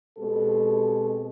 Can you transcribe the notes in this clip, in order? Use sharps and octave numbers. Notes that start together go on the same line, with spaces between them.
B2 G#3 C4 G4 A4